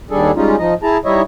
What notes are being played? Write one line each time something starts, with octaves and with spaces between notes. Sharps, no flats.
D#2 G3 D4 G#4 A4
G3 G#3 C#4 D#4 F4
F3 D#4 D#5
E4 G#4 A5 A#5
G3 D#4 E4 C#5 D#5 E5